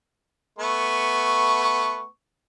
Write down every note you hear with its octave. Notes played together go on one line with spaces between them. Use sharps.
A3 B3 C#6